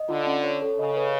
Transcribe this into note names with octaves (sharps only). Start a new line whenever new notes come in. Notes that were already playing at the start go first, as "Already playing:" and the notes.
Already playing: D#5
D3 F4
C#4
C#5
A4
C#3 D#5
B4